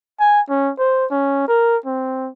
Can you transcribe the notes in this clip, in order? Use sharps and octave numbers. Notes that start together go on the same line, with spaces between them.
G#5
C#4
C5
C#4
A#4
C4